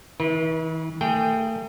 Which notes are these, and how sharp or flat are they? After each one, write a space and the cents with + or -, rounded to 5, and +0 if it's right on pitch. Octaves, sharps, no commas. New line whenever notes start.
E3 -45 E4 +0 B4 -40
A3 +35 G#4 +0 G5 +0